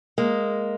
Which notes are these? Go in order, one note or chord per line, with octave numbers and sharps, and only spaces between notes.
G#3 A#3